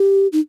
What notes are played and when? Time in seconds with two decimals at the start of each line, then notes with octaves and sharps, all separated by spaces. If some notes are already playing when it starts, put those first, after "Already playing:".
Already playing: G4
0.33 D#4